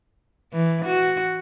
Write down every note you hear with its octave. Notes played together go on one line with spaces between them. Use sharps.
E3
F#4